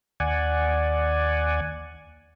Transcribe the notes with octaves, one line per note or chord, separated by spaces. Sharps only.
D#2 D5 F#5 G#5